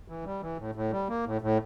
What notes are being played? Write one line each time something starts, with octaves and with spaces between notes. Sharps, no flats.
E3
G3
E3
A2
A2
G3
A#3
A2
A2